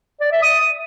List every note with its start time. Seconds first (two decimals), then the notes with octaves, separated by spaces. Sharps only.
0.21 D5
0.32 E5
0.43 D#6